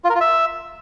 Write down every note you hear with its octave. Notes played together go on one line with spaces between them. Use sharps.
F4
A#4
F4
E5